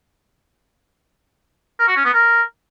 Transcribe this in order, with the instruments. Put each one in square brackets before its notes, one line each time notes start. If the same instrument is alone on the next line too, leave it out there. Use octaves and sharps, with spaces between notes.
[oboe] A#4
F#4
C#4
B3
A#4